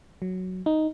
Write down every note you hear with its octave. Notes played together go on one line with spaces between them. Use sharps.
F#3
D#4